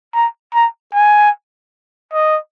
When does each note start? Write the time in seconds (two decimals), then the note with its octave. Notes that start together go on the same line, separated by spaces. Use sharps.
0.14 A#5
0.54 A#5
0.94 G#5
2.13 D#5